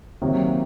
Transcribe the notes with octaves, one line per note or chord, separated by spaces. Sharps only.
C3 D#3 F#3 A#3